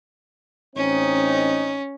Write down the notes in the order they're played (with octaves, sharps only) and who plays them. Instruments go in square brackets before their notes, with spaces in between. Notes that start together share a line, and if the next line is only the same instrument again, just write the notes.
[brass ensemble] A1 C4 D#4 [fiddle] C#4